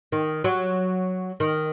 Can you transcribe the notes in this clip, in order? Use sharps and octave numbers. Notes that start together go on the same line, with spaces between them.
D#3
F#3
D#3